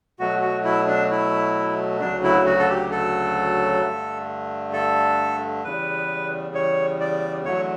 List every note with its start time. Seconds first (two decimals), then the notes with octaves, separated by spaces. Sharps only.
0.19 B2 F#3 A3 F#4
0.42 F#4
0.64 E4
0.87 D4
1.11 E4
2.00 D2 C#3 F#3 D4
2.24 E4
2.46 F#4
2.59 A4
2.69 G4
2.91 A4
3.82 G2 D3 A3
4.73 A4
5.64 E2 C#3 G3 B4
6.54 C#5
7.00 D5
7.45 E2 D3 F#3 A3 C#5